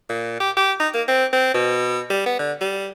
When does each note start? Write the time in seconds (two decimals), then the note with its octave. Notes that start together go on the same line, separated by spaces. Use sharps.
0.09 A#2
0.40 G4
0.57 G4
0.80 D#4
0.94 A#3
1.08 C4
1.33 C4
1.54 B2
2.10 G3
2.26 B3
2.39 D3
2.61 G3